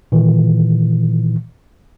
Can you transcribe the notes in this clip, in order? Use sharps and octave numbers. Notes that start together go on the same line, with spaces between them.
A#2 D#3 E3